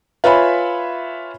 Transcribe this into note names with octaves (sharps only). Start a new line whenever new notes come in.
F4 B4 C#5 E5 G#5 B5